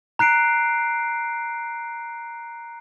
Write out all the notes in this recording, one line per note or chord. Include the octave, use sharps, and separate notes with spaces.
A#5 F#6 C7 D7